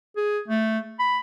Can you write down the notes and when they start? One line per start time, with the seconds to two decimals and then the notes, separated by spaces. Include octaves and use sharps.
0.16 G#4
0.48 A3
0.99 B5